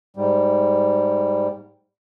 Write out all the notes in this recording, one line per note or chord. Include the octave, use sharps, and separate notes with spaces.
G#2 G3